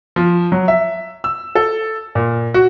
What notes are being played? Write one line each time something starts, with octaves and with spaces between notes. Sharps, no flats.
F3
F#3
E5
E6
A4
A#2
F#4